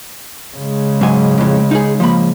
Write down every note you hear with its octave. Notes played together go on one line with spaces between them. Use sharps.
C#3 G#3
G#2 F#3 G#5
F2 A2
D#4 G#4
F3 A#3 B5